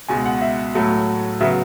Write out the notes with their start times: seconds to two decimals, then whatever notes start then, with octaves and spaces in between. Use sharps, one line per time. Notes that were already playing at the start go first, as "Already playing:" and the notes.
0.08 C#2 B2 G#3 G#5
0.26 F#5
0.41 E5
0.75 A2 F#3 A3
1.41 C#3 F#3 B3 E5